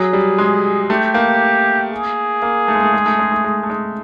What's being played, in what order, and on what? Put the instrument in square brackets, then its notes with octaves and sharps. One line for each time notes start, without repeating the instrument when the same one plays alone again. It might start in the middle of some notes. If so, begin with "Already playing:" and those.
Already playing: [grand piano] F#3 [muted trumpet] G#4
[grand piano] G3
G#3
[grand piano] A3 [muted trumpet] G4
[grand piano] A#3
[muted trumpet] G#4
[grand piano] A#3
A3
G#3
A3
G#3
A3
G#3
A3
G#3
A3
G#3